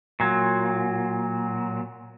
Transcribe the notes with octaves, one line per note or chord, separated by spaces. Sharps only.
A#2 F#3